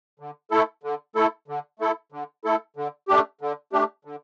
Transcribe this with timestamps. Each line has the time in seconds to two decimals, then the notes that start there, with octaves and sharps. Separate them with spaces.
0.20 D3
0.51 A3 E4 A4
0.83 D3
1.15 A3 E4 A4
1.48 D3
1.79 A3 E4 A4
2.12 D3
2.45 A3 E4 A4
2.76 D3
3.08 A3 D4 G4
3.41 D3
3.73 A3 D4 G4
4.05 D3